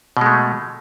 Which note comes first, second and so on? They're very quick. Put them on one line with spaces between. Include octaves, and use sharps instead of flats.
B2 G#3 A3